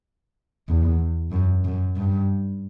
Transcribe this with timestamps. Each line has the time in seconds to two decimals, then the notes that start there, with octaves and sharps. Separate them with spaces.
0.69 E2
1.32 F#2
1.65 F#2
1.97 G2